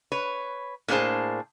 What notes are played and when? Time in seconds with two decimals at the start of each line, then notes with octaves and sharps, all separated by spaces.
0.12 B4 C#5
0.88 A2 A#3 D4 G#4 C5 A5